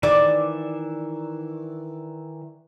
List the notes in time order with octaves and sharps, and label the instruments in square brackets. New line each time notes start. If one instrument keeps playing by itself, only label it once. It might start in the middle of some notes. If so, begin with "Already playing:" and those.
[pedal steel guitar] D#3 E3 E5 [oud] D5